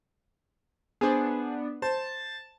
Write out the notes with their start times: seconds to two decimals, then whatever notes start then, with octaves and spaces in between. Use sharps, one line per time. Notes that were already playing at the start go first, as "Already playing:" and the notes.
1.01 B3 D4 G#4 C5
1.82 C5 A5